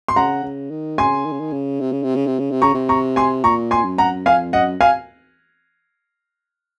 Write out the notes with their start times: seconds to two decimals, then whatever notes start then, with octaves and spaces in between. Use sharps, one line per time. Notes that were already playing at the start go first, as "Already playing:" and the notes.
0.08 C6
0.16 C#3 F#5 A#5
0.43 C#3
0.71 D#3
0.98 C#3 G#5 C6
1.25 D#3
1.32 C#3
1.40 D#3
1.52 C#3
1.80 C3
1.92 C#3
2.03 C3
2.16 C#3
2.27 C3
2.39 C#3
2.51 C3
2.62 C#3 A#5 C#6
2.75 C3
2.89 A#5 C#6
3.16 G#5 C6
3.44 A#2 A#5 C#6
3.71 G#5 C6
3.85 F#2
3.98 F#5 A#5
4.25 F2 F5 G#5
4.53 F#2 D#5 F#5
4.81 F5 G#5